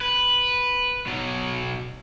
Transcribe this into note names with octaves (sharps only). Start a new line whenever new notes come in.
B4
B2 F#3